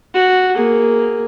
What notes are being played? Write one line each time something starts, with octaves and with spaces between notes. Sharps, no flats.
F#4
A#3 G#4